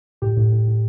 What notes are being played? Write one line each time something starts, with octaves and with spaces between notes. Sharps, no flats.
A2 G4
A2
A2
A2